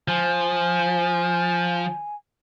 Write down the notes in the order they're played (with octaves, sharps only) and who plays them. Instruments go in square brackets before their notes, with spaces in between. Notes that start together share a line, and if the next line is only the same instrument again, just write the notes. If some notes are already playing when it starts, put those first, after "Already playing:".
[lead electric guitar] F3 [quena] G#5